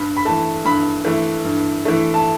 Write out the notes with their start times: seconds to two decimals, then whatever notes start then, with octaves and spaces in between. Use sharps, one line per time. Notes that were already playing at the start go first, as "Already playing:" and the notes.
Already playing: G2 B5
0.17 B5
0.25 E3 A3 A5
0.65 G2 B5
1.05 E3 A3
1.45 G2
1.85 E3 A3
2.14 A5